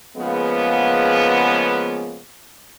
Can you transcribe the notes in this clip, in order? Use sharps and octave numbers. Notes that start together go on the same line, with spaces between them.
C#3 F3 G#3 A#3 B3